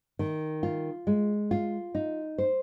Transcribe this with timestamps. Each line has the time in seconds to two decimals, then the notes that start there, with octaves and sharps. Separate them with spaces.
0.19 D#3
0.63 F4
1.07 G#3
1.51 F4
1.95 D#4
2.38 C5